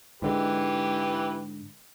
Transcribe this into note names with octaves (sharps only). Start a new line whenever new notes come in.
G#2 D3 E3 G#3 G4 B4